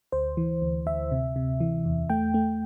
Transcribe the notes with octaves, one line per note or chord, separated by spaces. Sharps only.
D2 C5
E3
D2
D2 E5
C3
C3
E3
E2
A3 G5
A3